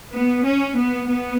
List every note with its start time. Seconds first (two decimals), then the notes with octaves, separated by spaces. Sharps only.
0.12 B3
0.45 C#4
0.77 B3
1.08 B3